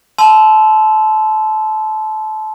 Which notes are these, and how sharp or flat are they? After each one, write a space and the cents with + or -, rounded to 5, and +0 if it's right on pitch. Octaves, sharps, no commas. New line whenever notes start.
A5 -25 C6 -25 E6 +0